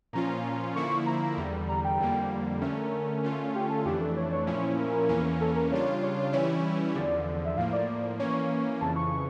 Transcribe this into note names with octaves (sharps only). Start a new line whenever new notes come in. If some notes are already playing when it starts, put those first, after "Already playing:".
A#2 F3 C#4 F4 A#5
D3 F3 A#3 E4 C#6
A#5
E2 D3 G3
A#5
G5
F2 D3 G3 A#3
D3 A3 C#4 A#4
D3 A3 C#4 F4
G4
A4
F2 E3 A3 D4 G4
A4
C#5
C#5
A#2 F3 C#4 E4
A#4
E2 E3 A#3 C#4
A4
A#4
C#3 G3 D4 F4 C#5
C#5
E3 G3 C#4 E4 C#5
E2 D3 F3 D5
E5
A2 F3 A#3 F5
D5
E3 A#3 C#4 C#5
F2 C#3 E3 A5
C#6